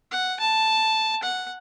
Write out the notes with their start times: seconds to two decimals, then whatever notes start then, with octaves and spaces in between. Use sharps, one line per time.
0.11 F#5
0.40 A5
1.23 F#5